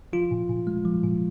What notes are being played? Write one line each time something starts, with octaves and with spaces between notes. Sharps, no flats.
F3 F4
A#2
A#2
G#3
F3
A#2